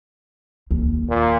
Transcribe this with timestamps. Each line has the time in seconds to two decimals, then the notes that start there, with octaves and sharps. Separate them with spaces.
0.71 D#2
1.09 A#2